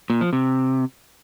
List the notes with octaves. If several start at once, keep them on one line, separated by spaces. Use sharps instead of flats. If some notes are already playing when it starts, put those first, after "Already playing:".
A#2
F3
C3